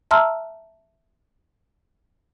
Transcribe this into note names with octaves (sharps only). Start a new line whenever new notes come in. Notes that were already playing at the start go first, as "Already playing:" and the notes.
E5 A5 A#5 C6 E6 F6